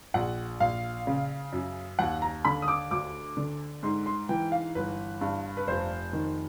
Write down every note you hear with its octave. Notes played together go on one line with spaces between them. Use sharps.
A#1 F#5
A#1 F5
C#3
F#2
D#2 F#5
A#5
D3 B5
D#6
D6
D2 D6
D3
G#2 C6
C6
E3 G5
F5
G1 B4
G2
B4
F1 C5
D#3